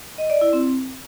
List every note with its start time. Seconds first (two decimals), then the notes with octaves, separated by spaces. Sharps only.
0.18 D#5
0.30 D5
0.41 E4
0.53 C4